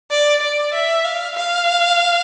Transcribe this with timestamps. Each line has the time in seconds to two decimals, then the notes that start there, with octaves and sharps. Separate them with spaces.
0.11 D5
0.42 D5
0.74 E5
1.05 F5
1.36 F5